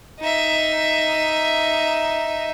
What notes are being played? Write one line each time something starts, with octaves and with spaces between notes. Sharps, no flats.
D#4 E5